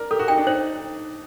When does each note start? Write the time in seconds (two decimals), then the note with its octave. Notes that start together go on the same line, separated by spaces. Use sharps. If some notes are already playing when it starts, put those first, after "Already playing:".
Already playing: A#4 D5
0.11 G4 A4
0.19 F#4
0.28 D#4 G5
0.38 D4
0.47 D#4 C5